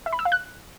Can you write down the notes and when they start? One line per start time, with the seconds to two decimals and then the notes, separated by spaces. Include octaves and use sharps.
0.06 E5
0.13 B5
0.19 E6
0.25 F5
0.32 F#6